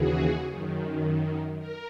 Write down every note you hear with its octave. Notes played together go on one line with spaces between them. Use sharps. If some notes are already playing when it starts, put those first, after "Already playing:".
Already playing: D#2 C#3 E3 F#4 G#4
F#2 D#3
A#4